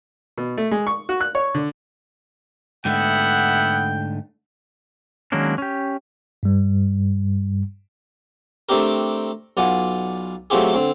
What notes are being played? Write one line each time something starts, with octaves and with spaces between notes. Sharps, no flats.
B2
A3
G#3
C#6
F#4
F#6
C#5
D3
G#2 D3 A3 B3 E5 F#5 G5
D#3 F#3 G#3 A#3 C#4 D4
C#4 G4
G2 G3
A3 C4 D4 G4 A#4
B1 F4 D5 F#5 G#5
F#3 A3 C4 F4 G4 G#4
D3 C4